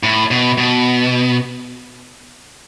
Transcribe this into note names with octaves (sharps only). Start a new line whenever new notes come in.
A2
B2
B2